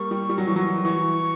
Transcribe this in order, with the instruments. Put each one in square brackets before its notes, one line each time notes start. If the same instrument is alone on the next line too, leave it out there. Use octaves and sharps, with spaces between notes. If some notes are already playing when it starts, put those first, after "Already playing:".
Already playing: [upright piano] G3 A#3 [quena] C#6
[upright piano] G3
G3
F#3
E3
F#3
[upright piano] E3 [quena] C#6